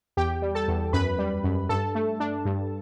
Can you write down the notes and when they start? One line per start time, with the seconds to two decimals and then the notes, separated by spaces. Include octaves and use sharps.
0.17 E2 G4 G5
0.42 G3
0.55 A4 A5
0.68 E2
0.93 F#2 B4 B5
1.18 G3
1.44 F#2
1.69 G2 A4 A5
1.95 A3
2.20 D4
2.45 G2